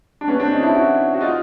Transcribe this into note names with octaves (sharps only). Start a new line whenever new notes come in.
D4
B3 C#4
C4 D4
C#4 D#4
D4 E4
E4 F#4
F#4
D#4 F4